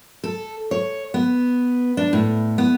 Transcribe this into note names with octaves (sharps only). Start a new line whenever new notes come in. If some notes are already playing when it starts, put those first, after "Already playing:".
A4
C#5
B3
D4
A2
B3